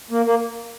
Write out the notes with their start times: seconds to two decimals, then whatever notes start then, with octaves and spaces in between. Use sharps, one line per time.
0.11 A#3
0.26 A#3